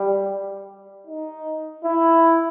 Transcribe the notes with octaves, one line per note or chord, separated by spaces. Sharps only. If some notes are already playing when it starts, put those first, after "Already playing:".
Already playing: G3
D#4
E4